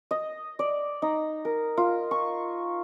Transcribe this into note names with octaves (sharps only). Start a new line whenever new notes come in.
D#5
D5
D#4
A#4
F4
C#6